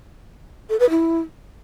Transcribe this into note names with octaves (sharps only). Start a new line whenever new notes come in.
A4
B4
E4